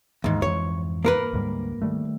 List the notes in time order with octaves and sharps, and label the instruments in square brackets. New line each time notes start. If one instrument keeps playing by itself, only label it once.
[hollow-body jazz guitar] D#2 G#2 [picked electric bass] E3
[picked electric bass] F2 G#2 E3 [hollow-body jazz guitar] C#5
[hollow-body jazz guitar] A#3 A#4 B4
[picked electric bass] D2 G#2 G3
D#3 G3 A3